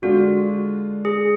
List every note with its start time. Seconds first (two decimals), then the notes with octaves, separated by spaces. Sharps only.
0.02 D3 G#3 D4 F4 F#4
1.05 G#4